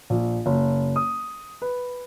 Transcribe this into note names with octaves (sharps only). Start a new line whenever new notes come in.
A#1
F#1
D#6
B4